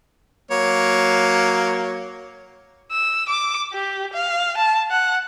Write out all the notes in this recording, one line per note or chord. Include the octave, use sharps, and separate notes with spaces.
F#3 A#3 C#5
E6
D6
G4
F5
A5
F#5